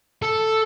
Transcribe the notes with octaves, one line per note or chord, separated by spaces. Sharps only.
A4